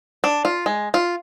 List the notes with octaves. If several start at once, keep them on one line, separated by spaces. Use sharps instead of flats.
D4
F4
G#3
F4